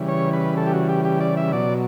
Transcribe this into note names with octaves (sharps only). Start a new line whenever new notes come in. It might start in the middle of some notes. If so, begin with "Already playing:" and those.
Already playing: C#3 E3 G3
C#5
B4
A4
G4
F#4
G4
G4
D5
E5
B2 F#3 D5